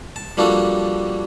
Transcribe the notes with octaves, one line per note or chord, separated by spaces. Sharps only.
A5
F3 G3 A#3 D4 F#4 A4